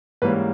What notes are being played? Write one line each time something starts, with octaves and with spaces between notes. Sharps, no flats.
G#2 E3 G3 A#3 C#4 B4